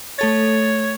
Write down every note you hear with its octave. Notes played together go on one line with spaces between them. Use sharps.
A3 A4 C#5 A6